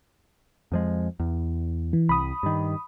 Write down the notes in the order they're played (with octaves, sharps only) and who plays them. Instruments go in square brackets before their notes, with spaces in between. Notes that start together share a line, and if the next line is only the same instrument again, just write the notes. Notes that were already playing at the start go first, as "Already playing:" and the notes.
[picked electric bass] F2 F3 G#3
E2
[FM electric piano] E3
[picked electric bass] C2 [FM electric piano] B5 D#6
[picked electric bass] G2 D#3